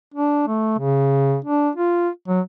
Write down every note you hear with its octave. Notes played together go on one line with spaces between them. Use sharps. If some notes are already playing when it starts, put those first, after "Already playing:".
D4
A3
C#3
D4
F4
F#3